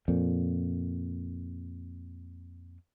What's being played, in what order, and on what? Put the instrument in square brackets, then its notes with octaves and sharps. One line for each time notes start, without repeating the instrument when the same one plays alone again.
[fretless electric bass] F2 A#2